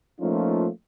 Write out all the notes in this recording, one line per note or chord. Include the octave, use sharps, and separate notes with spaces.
F3 A3 A#3 C#4 D#4 F4